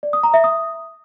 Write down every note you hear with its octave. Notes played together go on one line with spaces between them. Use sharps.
D5
D#6
A#5
E5
D#6